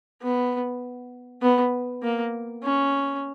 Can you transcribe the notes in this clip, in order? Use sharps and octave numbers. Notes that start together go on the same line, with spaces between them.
B3
B3
A#3
C#4